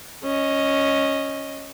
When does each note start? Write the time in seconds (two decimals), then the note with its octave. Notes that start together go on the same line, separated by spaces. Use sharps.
0.24 C#4 D#5